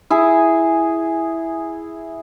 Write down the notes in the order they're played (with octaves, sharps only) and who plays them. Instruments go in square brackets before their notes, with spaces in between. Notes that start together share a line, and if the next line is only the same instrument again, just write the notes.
[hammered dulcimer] E4 G#4